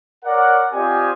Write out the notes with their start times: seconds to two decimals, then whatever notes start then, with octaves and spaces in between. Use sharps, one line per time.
0.25 A#4 C#5 D5 F#5
0.73 C4 F4 G4 D5 D#5 G#5